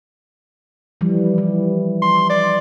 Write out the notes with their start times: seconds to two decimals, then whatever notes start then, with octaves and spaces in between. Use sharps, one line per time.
1.01 E3 F3 G3
1.38 E3
2.02 C6
2.30 D5